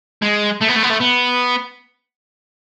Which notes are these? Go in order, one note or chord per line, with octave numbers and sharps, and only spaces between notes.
G#3
A3
B3
A3
B3
A3
B3